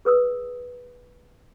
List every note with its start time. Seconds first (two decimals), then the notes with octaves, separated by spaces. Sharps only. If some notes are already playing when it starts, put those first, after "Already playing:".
0.05 G#4 B4 D#6 E6